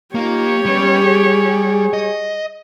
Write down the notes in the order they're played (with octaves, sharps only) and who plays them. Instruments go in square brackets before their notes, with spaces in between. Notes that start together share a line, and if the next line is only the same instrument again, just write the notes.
[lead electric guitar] A#3 [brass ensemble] D#4 F4 [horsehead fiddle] G4 C#5
[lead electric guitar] G3 [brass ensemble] G#3 B3 C#4
[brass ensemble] G#4
[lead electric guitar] D#5